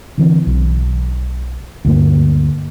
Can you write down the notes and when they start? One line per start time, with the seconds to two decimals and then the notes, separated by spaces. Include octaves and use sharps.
0.18 D3 E3 C4
0.47 B1
1.85 D2 G2 A#3